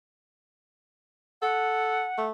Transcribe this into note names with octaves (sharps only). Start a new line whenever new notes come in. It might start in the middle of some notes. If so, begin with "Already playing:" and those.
A4 F#5
A3